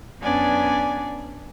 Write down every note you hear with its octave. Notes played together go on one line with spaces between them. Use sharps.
F#2 B3 C#4 D4 D5 G#5